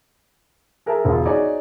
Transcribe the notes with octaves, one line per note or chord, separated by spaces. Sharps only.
G#4 A#4 E5 A5
E1 F4
D#4 F#4 G#4 C#5 D5